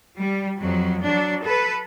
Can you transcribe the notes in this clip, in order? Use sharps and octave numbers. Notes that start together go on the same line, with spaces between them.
G3
F2 F#3
F#3 D4
A4 B4